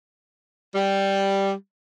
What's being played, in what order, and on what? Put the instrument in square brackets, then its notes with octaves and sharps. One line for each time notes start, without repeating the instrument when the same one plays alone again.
[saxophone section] G3